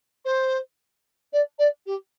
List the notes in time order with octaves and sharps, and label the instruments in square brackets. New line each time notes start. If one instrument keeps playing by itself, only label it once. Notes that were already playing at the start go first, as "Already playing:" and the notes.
[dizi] C5
D5
D5
G4